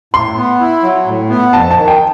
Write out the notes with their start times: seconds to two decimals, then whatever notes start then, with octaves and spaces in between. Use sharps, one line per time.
0.14 A2 C6
0.37 B3
0.60 E4
0.83 F#3
1.06 A2
1.30 B3
1.53 F2 A5
1.71 A5
1.76 D#3
1.88 G5